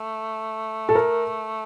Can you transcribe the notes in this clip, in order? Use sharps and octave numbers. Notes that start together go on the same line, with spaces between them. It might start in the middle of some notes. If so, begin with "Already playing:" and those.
Already playing: A3
A4
A#4